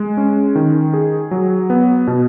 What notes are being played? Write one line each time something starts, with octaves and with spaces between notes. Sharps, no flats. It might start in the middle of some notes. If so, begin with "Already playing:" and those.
Already playing: G#3
C#4
D#3
G#4
F#3
B3
B2